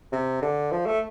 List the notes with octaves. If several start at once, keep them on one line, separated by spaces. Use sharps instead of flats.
C3
D3
F3
A3